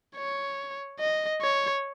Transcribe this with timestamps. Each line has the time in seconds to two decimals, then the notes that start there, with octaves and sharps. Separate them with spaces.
0.17 C#5
1.00 D#5
1.42 C#5